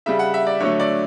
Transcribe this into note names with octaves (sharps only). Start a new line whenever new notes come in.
C#3 G3 E5
F#5
E5
D5
D3 F#3 A3 C#5
D5